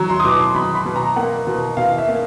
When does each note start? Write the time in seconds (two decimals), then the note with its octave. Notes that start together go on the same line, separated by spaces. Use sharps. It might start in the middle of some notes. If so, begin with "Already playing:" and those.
Already playing: F#3 A#5
0.09 C6
0.20 D#6
0.25 B2 D6
0.39 C6
0.55 F#3 B5
0.75 B5
0.85 B2
0.96 A#5
1.16 A#3 F#5
1.47 B2
1.77 B2 F5
1.98 E5
2.08 A#3